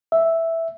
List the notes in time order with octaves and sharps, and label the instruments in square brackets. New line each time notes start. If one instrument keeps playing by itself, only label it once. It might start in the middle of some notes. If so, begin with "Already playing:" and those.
[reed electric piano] E5